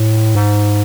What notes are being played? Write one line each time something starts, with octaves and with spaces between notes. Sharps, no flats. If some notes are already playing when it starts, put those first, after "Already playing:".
Already playing: A2
G#2